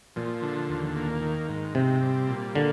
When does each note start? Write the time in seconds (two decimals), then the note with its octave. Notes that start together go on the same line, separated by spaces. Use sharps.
0.16 A#2 F3
0.42 D3
0.69 D#2
0.96 A#3
1.22 D#3
1.49 G#2
1.75 C3 C4
2.02 G3
2.28 A#2
2.55 D3 A#3